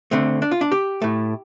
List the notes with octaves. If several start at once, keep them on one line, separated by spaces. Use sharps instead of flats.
D3 A3 C4
D4
F4
D4
G4
A2 A3